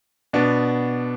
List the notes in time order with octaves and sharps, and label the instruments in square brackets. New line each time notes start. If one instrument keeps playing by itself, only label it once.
[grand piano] B2 B3 D4